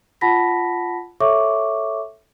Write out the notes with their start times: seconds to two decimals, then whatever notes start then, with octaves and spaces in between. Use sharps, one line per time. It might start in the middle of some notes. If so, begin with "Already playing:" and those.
0.21 F4 F#5 A5 B5 A#6 B6
1.20 A4 C#5 E5 C#6 D6